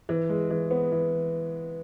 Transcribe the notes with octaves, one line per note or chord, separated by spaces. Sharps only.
E3
G#3
E3
B3
E3